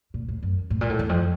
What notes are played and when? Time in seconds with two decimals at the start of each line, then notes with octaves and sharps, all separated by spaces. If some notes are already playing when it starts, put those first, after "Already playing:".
0.14 A#2
0.28 A2
0.42 F#2
0.70 A2
0.81 A#2
0.89 A2
0.99 E2
1.09 F2